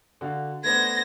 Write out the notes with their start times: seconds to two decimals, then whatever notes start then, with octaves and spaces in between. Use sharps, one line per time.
0.21 D3 F#4 F5
0.64 A3 B3 D4 C5 G#6 A#6